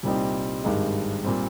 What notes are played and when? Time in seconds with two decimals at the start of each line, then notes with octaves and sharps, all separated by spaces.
0.03 C2 A#2 G3 C4 D#4
0.64 G#1 G2 D#3 G#3 D#4
1.24 A#2 G3 C4